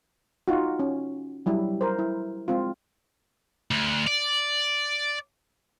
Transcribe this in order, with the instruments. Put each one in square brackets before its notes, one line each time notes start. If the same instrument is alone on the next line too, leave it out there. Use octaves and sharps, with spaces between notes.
[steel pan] D#4 F4 F#4
C#4
F#3 G3 E4
A#4 C5
E4
G#3 C4 F4
[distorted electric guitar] D2
D5